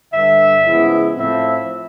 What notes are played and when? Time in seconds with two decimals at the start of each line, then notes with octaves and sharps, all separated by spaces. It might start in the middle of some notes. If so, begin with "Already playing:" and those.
0.13 G2 D3 G3 E5
0.65 C#3 F3 G#3 B3 E4
1.17 A2 F3 A3 C4 E4 E5